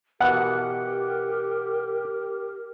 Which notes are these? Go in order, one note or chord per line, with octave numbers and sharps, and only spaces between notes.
B2 E3 B3 G4 A#4 F#5